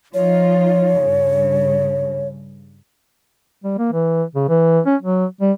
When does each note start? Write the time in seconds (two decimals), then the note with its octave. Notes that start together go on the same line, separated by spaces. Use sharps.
0.14 F3 D#4 F4 C#5
0.98 G2 C#3
3.64 G3
3.78 A#3
3.92 E3
4.35 C#3
4.49 E3
4.86 C#4
5.02 F#3
5.41 G3